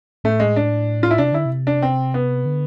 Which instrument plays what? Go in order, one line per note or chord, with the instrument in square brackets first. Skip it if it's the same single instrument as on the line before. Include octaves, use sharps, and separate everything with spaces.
[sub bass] A2 [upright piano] A3
[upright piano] G#3
D4
F4
E4
[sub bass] C3 [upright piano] D4
[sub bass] D3 [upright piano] E4
[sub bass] C3
[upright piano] D4
C4
B3
[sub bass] D3